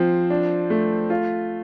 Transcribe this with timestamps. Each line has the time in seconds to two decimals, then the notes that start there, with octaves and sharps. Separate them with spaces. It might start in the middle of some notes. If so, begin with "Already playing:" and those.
Already playing: F3 C4
0.30 D4
0.70 A3
1.10 F4